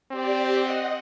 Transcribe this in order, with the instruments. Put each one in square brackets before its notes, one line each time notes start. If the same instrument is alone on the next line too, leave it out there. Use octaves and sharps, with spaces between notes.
[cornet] C4 [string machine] G4 D5
[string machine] D#5 F#5